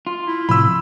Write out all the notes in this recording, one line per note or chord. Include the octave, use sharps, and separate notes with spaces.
F4
E4
A2 C3 F3 B5 E6